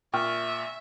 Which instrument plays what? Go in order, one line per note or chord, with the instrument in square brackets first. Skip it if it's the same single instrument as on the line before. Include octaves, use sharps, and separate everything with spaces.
[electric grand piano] A#2 [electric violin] E5 [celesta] G5 C#6 F6